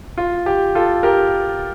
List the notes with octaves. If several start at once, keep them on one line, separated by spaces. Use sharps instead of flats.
F4
G4
F4 A4
G4 A#4